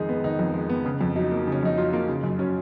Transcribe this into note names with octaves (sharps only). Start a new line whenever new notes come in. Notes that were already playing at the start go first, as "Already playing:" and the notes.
Already playing: F2 D#3 G#3 D#4 G#4
B3
D#3 D#4
F2
G#3
B3
C#3
F2
F#3 D#4
A#3
C#3
C#4
F2 D#4
F#3 F4
A#3 F4
C#3
F#2
F#3 C#4